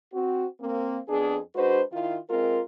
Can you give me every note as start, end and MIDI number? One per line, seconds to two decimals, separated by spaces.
0.13 0.46 60
0.13 0.46 66
0.60 0.98 58
0.60 0.98 60
1.09 1.39 41
1.09 1.39 59
1.09 1.39 62
1.09 1.39 68
1.56 1.81 56
1.56 1.81 62
1.56 1.81 66
1.56 1.81 71
1.56 1.81 72
1.92 2.17 51
1.92 2.17 64
1.92 2.17 65
2.30 2.60 56
2.30 2.60 60
2.30 2.60 65
2.30 2.60 70